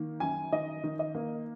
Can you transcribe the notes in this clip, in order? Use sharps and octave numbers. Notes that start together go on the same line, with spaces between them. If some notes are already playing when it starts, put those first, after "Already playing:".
Already playing: D#3 A#3
F#2 G#5
D#3 D#5
D#3
D#5
A#3